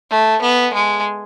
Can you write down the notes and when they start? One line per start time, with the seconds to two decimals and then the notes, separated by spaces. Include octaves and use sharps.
0.11 A3
0.42 B3
0.74 G#3